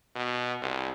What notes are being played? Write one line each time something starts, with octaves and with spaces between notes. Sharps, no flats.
B2
C2